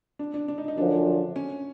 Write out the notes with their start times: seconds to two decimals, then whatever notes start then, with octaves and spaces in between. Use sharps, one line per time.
0.19 D4
0.34 D4
0.48 D4
0.58 D#4
0.68 D#4
0.78 F#2 D3 F3 D4
1.36 C#4